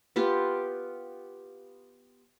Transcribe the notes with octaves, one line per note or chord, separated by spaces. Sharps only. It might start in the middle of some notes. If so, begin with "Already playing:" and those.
B3 F4 G4